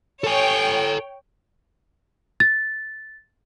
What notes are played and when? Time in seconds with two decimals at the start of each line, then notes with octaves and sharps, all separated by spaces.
0.24 A4 C#5 G5 G#5
2.40 A6